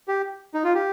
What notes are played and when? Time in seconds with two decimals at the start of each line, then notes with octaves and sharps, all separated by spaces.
0.08 G4
0.54 D#4
0.64 F4
0.75 G4